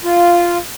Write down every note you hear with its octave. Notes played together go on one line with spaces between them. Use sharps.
F4